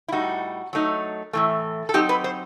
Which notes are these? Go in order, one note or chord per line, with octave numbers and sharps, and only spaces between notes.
E4
A2 G3 D#4 F#4
F#3 A3 D#4
A2 E3 A3
A4
F#3 C4 D#4 G4
B4
C5